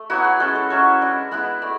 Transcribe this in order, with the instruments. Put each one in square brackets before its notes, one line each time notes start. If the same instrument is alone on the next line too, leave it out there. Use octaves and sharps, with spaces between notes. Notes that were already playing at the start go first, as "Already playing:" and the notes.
Already playing: [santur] A3 E5
F#3 B3 E4 F#4
G#4
G#3 C#4 E4 A4
A4
F#3 C#4 E4 C#5
G#3 D4
G#3 B3 E4 F#5
A3 D5